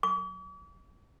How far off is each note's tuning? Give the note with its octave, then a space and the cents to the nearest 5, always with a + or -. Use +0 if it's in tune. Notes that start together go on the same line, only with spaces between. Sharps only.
D6 -45